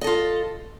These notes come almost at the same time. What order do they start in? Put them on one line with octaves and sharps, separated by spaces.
D#5 A4 F4